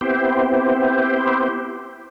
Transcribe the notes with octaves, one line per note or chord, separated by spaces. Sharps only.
B3 C4 E4 G4 C5